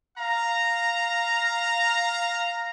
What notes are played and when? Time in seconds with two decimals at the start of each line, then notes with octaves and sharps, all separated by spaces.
0.17 F5 A#5